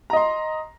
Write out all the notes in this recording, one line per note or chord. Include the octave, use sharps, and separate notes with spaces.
D#5 A#5 C6